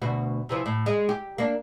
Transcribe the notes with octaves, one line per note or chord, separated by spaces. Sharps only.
D2 B2 F#4
C3 E3 F3
A2
G#3
G4
A#3 D4